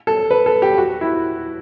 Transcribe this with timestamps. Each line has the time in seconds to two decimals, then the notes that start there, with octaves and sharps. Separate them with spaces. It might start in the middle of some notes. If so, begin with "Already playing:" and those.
0.07 A4
0.30 B4
0.46 A4
0.62 G4
0.78 F#4
1.01 E4